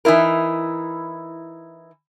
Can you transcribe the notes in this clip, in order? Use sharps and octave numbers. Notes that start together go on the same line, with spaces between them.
E3 D#4 E4 A#4